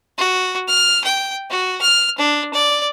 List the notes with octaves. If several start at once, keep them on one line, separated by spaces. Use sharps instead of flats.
F#4
F6
G5
F#4
F6
D4
D5